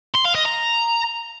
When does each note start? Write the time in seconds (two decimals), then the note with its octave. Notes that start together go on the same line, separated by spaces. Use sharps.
0.15 C6
0.25 F5
0.35 D#5
0.45 A#5